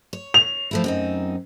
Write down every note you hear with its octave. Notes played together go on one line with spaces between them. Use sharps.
C#5
F7
F3 A3 E4
F#2 C4 D#4